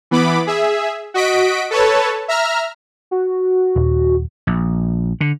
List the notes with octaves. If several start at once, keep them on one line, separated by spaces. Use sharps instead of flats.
E3 B3 B5 D6
G#4 E5
F#4 D#5 B6 D7
A4 B4 C#5 A5
E5 A#5 F6
F#4
D#1
A#1
D3